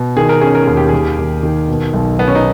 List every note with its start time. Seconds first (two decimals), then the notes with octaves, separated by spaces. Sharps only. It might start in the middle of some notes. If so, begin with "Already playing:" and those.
Already playing: B2
0.17 D#3 G#4
0.29 A#4
0.41 C#4 G#4
0.55 A#4
0.66 D#2 G#4
0.77 G4
0.89 D#2 G#4
1.18 D#2
1.43 D#3
1.68 B2
1.93 B1
2.19 B1 B3
2.28 C#4
2.35 D#4